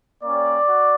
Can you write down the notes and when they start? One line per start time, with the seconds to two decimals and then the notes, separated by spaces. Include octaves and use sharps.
0.23 A#3 C#4 G4 D5
0.66 F#4